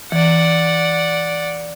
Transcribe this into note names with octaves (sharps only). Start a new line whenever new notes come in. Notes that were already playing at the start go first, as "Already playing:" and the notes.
E3 D5 F#5